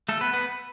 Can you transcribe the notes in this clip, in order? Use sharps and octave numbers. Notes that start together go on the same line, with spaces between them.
A3 A4
B3 B4
B3 B4